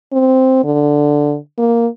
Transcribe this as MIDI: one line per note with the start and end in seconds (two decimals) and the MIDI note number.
0.13 0.62 60
0.64 1.37 50
1.58 1.87 58